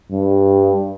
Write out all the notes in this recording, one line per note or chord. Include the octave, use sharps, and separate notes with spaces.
G2